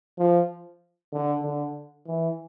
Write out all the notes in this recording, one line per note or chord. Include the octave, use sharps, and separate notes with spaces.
F3
D3
D3
E3